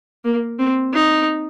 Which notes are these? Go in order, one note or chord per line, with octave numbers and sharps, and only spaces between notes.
A#3
C4
D#4